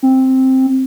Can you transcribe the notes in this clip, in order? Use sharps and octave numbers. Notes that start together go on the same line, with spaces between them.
C4